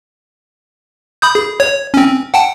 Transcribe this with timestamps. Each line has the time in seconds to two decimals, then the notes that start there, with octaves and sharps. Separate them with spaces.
1.22 B5 D#6 G6
1.35 G#4
1.60 C#5
1.94 C4 C#4
2.34 F#5 G5 A5